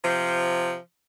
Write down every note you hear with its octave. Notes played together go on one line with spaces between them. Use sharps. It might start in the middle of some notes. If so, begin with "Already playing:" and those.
C3 F3